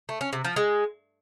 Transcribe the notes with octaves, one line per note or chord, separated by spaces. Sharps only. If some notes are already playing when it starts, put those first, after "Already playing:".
A3
C#4
C3
F3
G#3